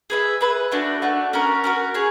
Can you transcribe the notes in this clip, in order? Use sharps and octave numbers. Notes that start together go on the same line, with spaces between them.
G#4 B4 E5
G#4 B4 E5
A3 D4 F#4
A3 D4 F#4
C#4 F#4 A#4
C#4 F#4 A#4
G#4 C#5